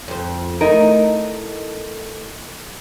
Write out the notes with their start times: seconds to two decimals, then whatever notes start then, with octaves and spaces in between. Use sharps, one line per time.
0.08 F2 C5
0.61 A3 D#4 E4 A#4